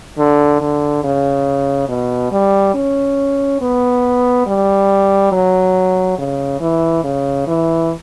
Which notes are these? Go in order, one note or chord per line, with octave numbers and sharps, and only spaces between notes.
D3
D3
C#3
B2
G3
C#4
B3
G3
F#3
C#3
E3
C#3
E3